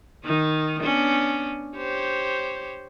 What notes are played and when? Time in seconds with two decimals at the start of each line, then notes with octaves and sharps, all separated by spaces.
0.24 D#3 D#4
0.81 B3 C#4 D4
1.76 G4 C5 C#5